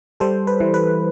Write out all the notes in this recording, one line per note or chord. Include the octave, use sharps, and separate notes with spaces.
G3 A4 C5
B4
E3
B4